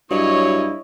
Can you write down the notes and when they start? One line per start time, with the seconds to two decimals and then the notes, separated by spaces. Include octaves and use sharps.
0.11 G2 F#3 E4 C#5 D#5